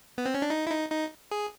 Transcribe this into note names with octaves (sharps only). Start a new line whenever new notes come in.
B3
C4
C#4
D4
D#4
E4
D#4
D#4
G#4